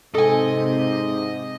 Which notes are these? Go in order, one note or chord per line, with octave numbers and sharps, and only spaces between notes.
G#2 C3 A4 D#5 G#5